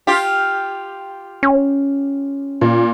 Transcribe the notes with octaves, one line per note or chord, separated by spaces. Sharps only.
F4 G4
C#4
A#2